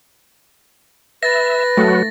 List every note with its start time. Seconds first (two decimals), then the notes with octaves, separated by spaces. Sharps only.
1.23 B4 E5 A6 A#6
1.77 F#3 A3 F#4